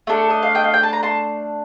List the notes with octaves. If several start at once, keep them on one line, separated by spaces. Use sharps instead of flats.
A3 D4 A4
D#5
F5
D#5 G5
F5
G5
A5
A#5
A5 C6